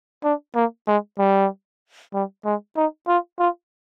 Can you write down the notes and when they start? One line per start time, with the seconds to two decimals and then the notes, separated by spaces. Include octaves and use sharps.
0.24 D4
0.56 A#3
0.87 G#3
1.19 G3
2.14 G3
2.45 G#3
2.76 D#4
3.08 F4
3.39 F4